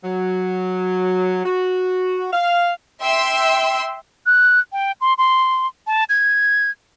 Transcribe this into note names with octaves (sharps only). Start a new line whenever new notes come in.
F#3
F#4
F5
E5 G5 C6 E6
F#6
G5
C6
C6
A5
G#6